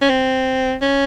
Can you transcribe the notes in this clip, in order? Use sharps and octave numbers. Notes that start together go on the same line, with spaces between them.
C#4
C4
C#4